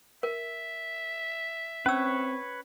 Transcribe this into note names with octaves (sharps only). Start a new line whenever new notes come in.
A#4 E5
C4 C#4 B4 C#5 E6